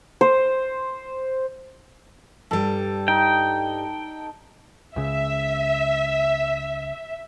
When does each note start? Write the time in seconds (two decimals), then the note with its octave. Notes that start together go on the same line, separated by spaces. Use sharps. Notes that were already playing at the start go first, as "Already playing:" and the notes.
0.21 C5
2.51 G2 G3 A4
3.08 D#4 G5
4.96 C#2 C#3 E5